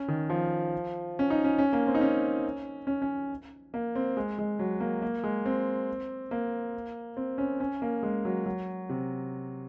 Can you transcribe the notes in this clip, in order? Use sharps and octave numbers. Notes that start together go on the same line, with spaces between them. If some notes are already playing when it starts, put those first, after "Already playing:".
Already playing: C#4
D#3
F3
C#4
D#4
C#4
C#4
A#3
C4
D#4
C#4
C#4
C#4
A#3
C4
G#3
G#3
F#3
A#3
A#3
G#3
C4
A#3
C4
C#4
C#4
A#3
G#3
F#3
F#3
C3